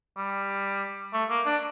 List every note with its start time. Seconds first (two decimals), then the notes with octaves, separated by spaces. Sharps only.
0.17 G3
1.13 A3
1.30 A#3
1.46 D4